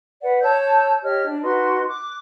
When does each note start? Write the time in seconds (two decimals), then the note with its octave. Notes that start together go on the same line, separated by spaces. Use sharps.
0.22 B4 D5 F#5
0.42 C#5 A5 E6 G6
1.04 G4 C#5 D#5 F6
1.25 D4
1.42 D#4 F#4 B4 C6
1.89 D6 F#6